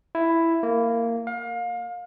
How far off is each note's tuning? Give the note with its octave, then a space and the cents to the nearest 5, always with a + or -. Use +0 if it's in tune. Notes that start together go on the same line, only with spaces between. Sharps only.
E4 +5
A#3 -15
F5 +30